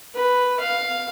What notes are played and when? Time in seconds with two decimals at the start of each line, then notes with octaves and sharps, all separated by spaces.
0.14 B4
0.59 F5